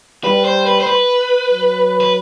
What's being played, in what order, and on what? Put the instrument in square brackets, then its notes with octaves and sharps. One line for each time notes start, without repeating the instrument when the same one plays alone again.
[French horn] G3 [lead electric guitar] B4
[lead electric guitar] C5
B4
C5
B4
[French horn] F#3
[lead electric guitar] B4